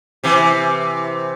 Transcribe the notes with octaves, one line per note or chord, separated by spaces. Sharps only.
C3 E3